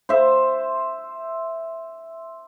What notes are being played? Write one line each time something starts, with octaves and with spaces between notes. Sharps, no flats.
C5 E5